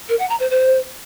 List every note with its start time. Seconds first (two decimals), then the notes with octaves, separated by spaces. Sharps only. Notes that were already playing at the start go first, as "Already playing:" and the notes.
0.09 A#4
0.19 F#5
0.29 A#5
0.40 C5
0.50 C5